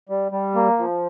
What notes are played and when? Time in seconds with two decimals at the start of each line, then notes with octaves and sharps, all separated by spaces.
0.09 G3
0.32 G3
0.55 A#3
0.78 F3